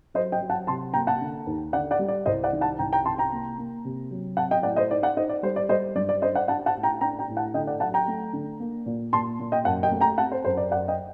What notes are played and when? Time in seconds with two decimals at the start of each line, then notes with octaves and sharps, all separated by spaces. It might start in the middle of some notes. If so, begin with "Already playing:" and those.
0.14 F#3 C5 D#5
0.32 D#5 G5
0.41 F#3
0.50 F#5 A5
0.67 C3 A5 C6
0.94 A#3 G5 A#5
1.07 F#5 A5
1.21 D3
1.47 D#2
1.73 D3 D5 F#5
1.91 D5 F#5
1.99 G3
2.08 D5
2.26 C2 C5 D#5
2.44 D5 F#5
2.53 D#3
2.61 F#5 A5
2.79 C2 G5 A#5
2.93 G5 A#5
3.05 C3 A5 C6
3.18 G5 A#5
3.32 A#3
3.58 A#3
3.85 C3
4.11 F#3
4.37 C4 F#5 A5
4.51 D#5 G5
4.63 A2 D5 F#5
4.76 C5 D#5
4.91 D#4 D5
5.03 D5 F#5
5.17 D#4 C5 D#5
5.29 D5
5.43 G3 C5
5.56 D5
5.69 G3 C5 D#5
5.95 G2 D5
6.09 D5
6.22 D4 C5 D#5
6.35 D5 F#5
6.48 D4 F#5 A5
6.66 F#5 A5
6.75 A2
6.83 G5 A#5
7.01 D4 G5 A#5
7.19 G5 A#5
7.28 A2
7.37 F#5 A5
7.54 D3 D#5 G5
7.67 D5 F#5
7.80 F#3 F#5 A5
7.94 G5 A#5
8.08 A3
8.33 D3
8.60 A#3
8.86 A#2
9.13 A#2 A5 C6
9.40 A#2
9.52 D#5 G5
9.65 F#2 F#5 A5
9.83 D#5 G5
9.91 A3
10.01 G5 A#5
10.18 C4 F#5 A5
10.32 C5
10.45 F#2 C5
10.57 D5
10.71 F#2 D5 F#5
10.88 D#5 G5